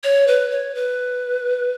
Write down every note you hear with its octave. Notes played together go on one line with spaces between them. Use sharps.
C#5
B4
C#5
B4